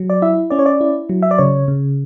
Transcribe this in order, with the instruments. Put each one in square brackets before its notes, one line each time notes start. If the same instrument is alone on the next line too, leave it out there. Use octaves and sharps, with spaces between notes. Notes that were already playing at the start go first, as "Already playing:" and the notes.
Already playing: [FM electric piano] F#3
D5
E4 E5
C#4 D5
C#5
D5
E4
F#3
E5
D5
C#3 C#5
C#3